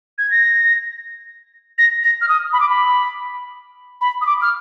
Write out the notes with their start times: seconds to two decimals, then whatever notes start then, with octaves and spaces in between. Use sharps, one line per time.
0.18 G#6
0.31 A#6
1.78 A#6
2.03 A#6
2.21 F6
2.29 D#6
2.53 B5
2.60 D6
2.70 B5
4.01 B5
4.21 D#6
4.26 D6
4.42 F6